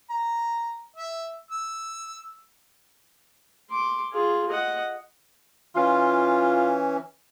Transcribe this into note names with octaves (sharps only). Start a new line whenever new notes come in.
A#5
E5
E6
C6 D6
F4 G#4
D#5 F#5
E3 C#4 F4